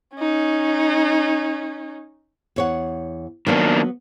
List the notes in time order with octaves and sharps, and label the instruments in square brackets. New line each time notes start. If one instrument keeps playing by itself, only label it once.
[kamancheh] C#4 D#4
[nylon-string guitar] E2 C#5 F#5
[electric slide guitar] D#3 A#3 D4 [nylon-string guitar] F#3 B3 F#4